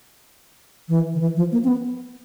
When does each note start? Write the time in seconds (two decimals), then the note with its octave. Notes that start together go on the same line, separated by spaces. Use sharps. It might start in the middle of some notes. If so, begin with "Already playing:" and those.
0.89 E3
1.14 D#3
1.20 E3
1.36 F3
1.52 A#3
1.64 C4
1.68 B3